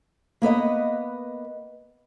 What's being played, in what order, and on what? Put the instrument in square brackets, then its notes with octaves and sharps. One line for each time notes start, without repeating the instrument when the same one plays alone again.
[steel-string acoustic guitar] A#3 B3 B4 D#5